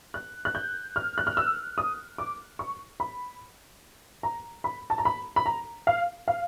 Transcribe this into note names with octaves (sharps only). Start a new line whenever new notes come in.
F#6
F#6
G6
F6
F#6
F6
E6
D#6
D6
C#6
B5
A#5
B5
A5
A#5
B5
B5
A#5
F5
F5